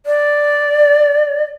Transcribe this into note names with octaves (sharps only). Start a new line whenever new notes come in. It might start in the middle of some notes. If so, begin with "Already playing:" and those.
D5